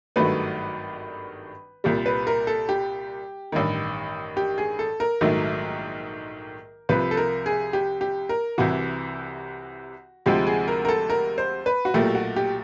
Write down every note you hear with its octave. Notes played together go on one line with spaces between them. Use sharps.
G#1 G2 D#3 F#3 A3 B4
C2 A#2 G3
B4
A#4
A4
G4
A1 G2 D#3
G4
G#4
A4
A#4
A#1 G#2 D#3 F#3 A3
C2 C3 F3 B4
A4
A#4
G#4
G4
G4
A#4
C2 C3 E3 F#4
D2 C3 F3 G#3 G4
G#4
A#4
A#4
A4
A#4
C5
B4
F#4
B1 A#2 F#3 A3 G4
F#4
G4